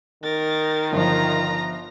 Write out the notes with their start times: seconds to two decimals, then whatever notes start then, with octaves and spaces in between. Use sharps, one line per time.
0.24 D#3 A#4 A6
0.93 G1 F3 F4 A#5